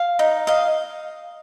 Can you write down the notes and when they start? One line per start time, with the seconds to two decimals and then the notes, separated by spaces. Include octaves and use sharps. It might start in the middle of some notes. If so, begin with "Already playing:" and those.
Already playing: F5
0.19 D#4
0.47 D#5 F5